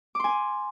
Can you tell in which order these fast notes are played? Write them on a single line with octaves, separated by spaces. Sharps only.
D6 C6 G#5